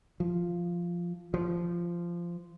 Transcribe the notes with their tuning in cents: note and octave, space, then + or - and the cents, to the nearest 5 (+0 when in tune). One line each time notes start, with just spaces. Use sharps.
F3 -5
F3 -15